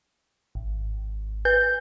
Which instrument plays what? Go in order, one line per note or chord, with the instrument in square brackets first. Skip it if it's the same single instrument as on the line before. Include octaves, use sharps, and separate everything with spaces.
[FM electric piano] G#1
[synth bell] B4 [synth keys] G6